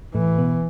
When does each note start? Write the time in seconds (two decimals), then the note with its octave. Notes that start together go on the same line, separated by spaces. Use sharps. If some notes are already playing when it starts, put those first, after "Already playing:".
0.14 A2 E3 A3
0.38 B2 B3